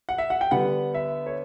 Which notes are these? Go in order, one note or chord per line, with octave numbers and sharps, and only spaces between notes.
F#5
E5
F#5
G5
D3 G3 B3 F#5
E5
C#5